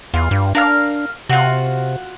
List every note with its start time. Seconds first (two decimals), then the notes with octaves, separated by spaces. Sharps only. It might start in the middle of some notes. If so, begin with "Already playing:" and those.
0.14 E2 F4
0.31 G2
0.55 D4 A#4 F5 F6
1.29 C3 F4 F#4